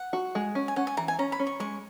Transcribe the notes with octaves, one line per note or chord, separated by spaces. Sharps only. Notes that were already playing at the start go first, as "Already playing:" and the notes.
Already playing: F#5
F#4
G#3
C#4
G#5
C#4 F#5
G#5
E3 A#5
G#5
C#4 A#5
B5
C#4
C#6
G#3 C#6